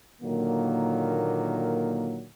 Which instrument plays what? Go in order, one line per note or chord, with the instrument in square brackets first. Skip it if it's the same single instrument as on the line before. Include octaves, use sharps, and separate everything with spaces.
[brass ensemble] A#2 D3 D#3 F#3 A#3